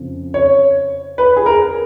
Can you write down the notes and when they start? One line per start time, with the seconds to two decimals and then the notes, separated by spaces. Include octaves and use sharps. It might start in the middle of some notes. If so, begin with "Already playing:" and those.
Already playing: F2 C#3
0.34 C#5
1.18 B4
1.36 G#4
1.46 A#4